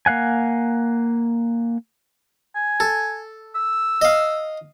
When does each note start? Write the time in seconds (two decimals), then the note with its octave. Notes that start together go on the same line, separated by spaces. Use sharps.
0.06 A#3 F5 F#5 G#5
2.55 G#5
2.80 A4
3.55 E6
4.02 D#5 F5